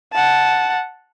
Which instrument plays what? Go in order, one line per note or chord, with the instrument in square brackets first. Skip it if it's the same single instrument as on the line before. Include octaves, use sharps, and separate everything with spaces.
[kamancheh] F#5 A5